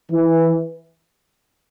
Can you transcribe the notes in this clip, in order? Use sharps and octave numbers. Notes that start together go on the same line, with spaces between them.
E3